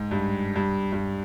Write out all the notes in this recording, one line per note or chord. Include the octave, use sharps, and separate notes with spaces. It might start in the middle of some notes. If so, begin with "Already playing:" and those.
Already playing: G#2
G2
G2
G2